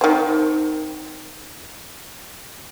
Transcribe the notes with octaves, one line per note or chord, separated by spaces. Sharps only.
D#3 C4